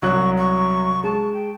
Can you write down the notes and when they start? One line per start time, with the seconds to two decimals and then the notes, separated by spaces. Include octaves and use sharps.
0.02 C2 F#3 C#6 F#6
0.38 C#6
1.04 G#3 A5
1.34 G5